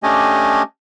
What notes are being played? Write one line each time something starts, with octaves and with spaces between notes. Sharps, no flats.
A3 C#4 D4 G4 D#5 G#5